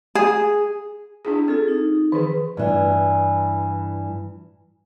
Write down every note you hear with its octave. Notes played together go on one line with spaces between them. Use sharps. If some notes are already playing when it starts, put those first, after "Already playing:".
G#4
D4 E4 G#4
C4 F4 G#4 A4
D#4
D#3 E3 G#4 B4
G2 E3